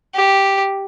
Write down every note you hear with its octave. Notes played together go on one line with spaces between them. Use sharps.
G4